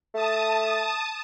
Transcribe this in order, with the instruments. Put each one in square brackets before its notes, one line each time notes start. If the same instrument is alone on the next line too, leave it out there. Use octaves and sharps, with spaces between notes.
[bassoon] A3 [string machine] A5 D#6